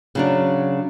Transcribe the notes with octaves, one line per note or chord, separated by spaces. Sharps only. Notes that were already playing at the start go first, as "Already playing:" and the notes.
C#3 F#3 D4